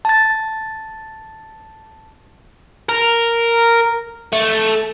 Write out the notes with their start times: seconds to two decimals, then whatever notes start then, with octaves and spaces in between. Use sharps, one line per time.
0.05 A5 A6
2.89 A#4
4.33 A3